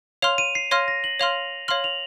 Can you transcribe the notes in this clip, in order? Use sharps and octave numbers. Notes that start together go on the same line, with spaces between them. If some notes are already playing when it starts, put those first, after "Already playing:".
C#5 F5 C6 F6 F7
D#7
C7
C#5 F5 C6 F6 A#6
A#6
F#7
C#5 F5 C6 F6 F7
C#5 F5 C6 F6 F#7
F7